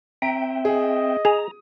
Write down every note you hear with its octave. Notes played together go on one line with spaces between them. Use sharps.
C4 E5 G5 A#5
G#4 D#5
G#4 A#5 D#6